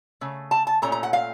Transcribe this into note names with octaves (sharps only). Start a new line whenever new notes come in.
C#3 A3
A5
A5
A#2 A3 C#4 A#5
A#5
F#5
F5